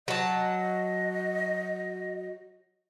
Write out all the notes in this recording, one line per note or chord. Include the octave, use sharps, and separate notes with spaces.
F#3 D#5 A5